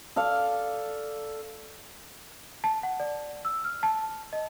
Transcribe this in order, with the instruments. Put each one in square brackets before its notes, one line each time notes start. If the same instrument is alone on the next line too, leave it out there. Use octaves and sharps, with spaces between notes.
[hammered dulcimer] A4 D5 F5
[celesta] A5
F#5
D5
E6
F6
A5
D#5